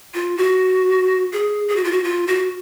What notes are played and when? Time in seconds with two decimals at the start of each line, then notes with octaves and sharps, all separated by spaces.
0.14 F4
0.38 F#4
1.33 G#4
1.68 G#4
1.76 F#4
1.84 F4
1.92 F#4
2.04 F4
2.27 F#4